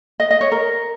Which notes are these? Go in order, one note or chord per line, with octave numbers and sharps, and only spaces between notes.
D#5
D#5
C#5
A#4